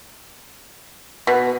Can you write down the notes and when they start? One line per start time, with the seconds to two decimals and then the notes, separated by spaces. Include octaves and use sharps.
1.27 B2